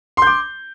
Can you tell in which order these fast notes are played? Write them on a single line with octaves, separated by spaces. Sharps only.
C6 G6 D6